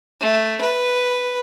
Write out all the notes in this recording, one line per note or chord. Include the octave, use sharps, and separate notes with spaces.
A3
B4